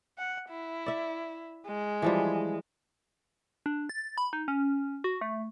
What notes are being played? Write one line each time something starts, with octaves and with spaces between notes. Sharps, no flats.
F#5
E4
D5 E5
G#3
E3 F3 G3
D4
A6
B5
D#4
C#4
F#4
A3